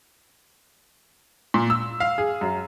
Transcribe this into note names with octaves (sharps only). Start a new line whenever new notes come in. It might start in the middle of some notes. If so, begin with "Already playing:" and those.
A#2
E6
F5
G#4
F#2